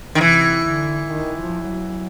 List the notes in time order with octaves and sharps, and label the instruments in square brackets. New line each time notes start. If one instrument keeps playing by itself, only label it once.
[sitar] D#3
[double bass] C3 [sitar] E3
[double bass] D3
D#3
F3
F#3